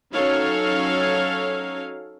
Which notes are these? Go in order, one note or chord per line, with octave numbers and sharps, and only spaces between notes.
F#3 C#4 D#4 A4 C#5 F5